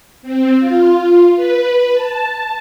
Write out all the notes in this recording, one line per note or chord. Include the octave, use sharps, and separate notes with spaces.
C4
F4
B4
A5